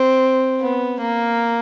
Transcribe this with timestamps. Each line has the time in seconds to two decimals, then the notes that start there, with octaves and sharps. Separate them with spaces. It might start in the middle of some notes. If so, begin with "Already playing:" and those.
Already playing: C4
0.61 B3
1.01 A#3